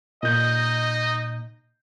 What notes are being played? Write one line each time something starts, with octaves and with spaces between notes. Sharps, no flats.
A#2 D#4 D#5 G6